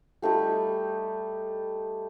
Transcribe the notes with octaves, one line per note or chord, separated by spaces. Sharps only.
G3 A3 D#4 G4